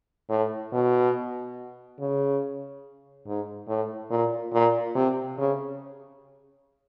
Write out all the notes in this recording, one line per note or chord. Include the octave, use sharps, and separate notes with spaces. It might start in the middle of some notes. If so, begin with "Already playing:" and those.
A2
B2
C#3
G#2
A2
A#2
A#2
C3
C#3